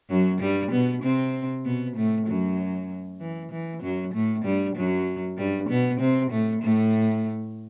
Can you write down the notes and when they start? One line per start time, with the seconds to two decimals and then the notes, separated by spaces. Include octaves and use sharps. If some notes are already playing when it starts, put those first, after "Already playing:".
0.10 F#2 F#3
0.41 G2 G3
0.72 B2 B3
1.03 C3 C4
1.65 B2 B3
1.96 A2 A3
2.27 F#2 F#3
3.20 E3
3.52 E3
3.82 F#2 F#3
4.14 A2 A3
4.45 G2 G3
4.76 F#2 F#3
5.38 G2 G3
5.69 B2 B3
6.00 C3 C4
6.31 A2 A3
6.62 A2 A3